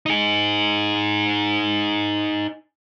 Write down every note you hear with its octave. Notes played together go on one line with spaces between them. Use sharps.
D#4 G#4